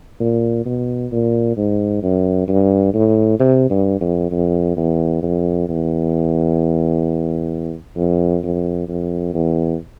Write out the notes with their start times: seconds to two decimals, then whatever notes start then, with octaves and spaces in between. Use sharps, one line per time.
0.20 A#2
0.65 B2
1.12 A#2
1.57 G#2
2.03 F#2
2.48 G2
2.94 A2
3.40 C3
3.70 G2
4.01 F2
4.31 F2
4.77 E2
5.23 F2
5.69 E2
7.96 F2
8.43 F2
8.89 F2
9.34 E2